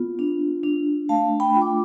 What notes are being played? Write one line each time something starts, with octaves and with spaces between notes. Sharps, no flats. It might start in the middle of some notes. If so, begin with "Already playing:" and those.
Already playing: B3 F4
D4
D4
A3 F5 A5
G5 B5
F4
D6